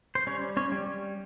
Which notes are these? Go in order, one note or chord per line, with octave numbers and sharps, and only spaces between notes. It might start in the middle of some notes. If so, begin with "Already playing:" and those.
C5
G3 C#4 C#5
C#4 C#5
G3